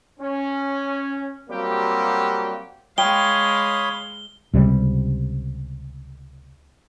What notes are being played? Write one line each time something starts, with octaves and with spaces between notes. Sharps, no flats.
C#4
F#3 G3 A#3 C4 F#4 G4
G#3 C#5 F5 G5 B5 D#6 G7
C#2 C3 G3